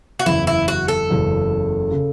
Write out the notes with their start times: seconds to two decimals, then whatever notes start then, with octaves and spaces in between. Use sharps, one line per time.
0.19 F#4
0.26 F#1 E2 C#3 E4
0.47 E4
0.68 F#4
0.88 A4
1.09 F#1 E2 C#3
1.91 C#3